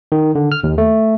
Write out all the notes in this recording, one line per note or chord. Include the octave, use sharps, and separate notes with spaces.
D#3
D3
F6
D#2
A3